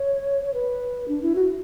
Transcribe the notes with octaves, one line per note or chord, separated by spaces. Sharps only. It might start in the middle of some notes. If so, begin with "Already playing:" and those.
Already playing: C#5
C#5
B4
D4
E4
F#4